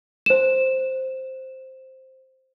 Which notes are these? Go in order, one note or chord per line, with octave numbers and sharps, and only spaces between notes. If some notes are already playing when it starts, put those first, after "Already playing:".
C5 E7